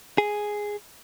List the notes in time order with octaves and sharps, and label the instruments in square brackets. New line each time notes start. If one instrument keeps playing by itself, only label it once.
[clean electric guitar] G#4